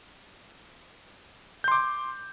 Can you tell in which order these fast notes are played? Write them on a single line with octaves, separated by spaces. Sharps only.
G6 C6 D6